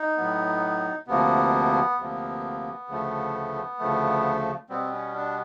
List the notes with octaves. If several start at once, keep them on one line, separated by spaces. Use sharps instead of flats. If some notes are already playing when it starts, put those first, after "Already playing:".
Already playing: D#4
A2 F#3 B3
D2 C3 F3 A#3 B3
D2 C3 F3 A#3
D2 C#3 F3 A3
D2 C#3 F3 A3
B2 G3 B3 C4
C#4
D4